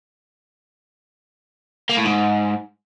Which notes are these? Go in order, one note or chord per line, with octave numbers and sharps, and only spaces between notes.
A#3
A2
G#2